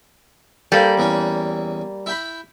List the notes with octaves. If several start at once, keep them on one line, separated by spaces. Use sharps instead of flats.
G3 A#3 A4 C5
E2 E3 C#4
E4 G5 B5